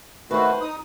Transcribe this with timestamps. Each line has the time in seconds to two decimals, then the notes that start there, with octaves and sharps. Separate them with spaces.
0.31 D#3 A3 F#4 B4 C5
0.61 D#4 D#6